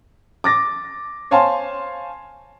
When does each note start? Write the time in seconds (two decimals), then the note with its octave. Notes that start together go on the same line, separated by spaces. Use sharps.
0.44 D6 A6 A#6
1.31 C5 C#5 F5 G#5 A5 C6